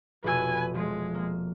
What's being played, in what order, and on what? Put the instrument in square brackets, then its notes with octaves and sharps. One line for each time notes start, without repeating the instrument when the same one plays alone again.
[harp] F1 B2 E6 [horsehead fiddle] B4 G#5
[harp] F3 [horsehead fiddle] G#3
[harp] A#3